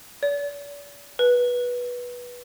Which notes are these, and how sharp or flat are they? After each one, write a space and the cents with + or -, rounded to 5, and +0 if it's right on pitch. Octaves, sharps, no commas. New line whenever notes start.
D5 -45
B4 -15